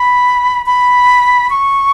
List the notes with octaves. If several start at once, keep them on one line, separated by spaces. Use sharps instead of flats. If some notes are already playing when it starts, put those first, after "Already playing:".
Already playing: B5
B5
C#6